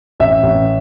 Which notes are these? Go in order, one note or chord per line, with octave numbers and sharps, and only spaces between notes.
A1 E5
A1